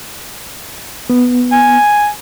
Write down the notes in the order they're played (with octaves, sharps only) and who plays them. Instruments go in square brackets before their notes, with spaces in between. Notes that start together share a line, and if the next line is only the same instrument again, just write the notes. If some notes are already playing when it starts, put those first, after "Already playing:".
[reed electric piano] B3
[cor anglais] G#5